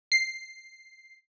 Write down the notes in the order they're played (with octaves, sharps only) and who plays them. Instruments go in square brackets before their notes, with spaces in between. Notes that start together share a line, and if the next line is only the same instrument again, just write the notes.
[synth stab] C7